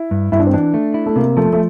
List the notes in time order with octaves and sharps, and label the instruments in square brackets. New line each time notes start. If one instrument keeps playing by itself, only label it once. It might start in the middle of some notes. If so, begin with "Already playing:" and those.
Already playing: [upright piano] E4
[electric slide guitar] G2
[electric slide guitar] G2 [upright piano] E4
[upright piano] D4
C4
[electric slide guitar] E3 [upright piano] D4
[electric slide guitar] A3
E4
[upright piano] A3
[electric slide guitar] C3 [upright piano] A#3
[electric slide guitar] F3 [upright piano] A3
[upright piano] A3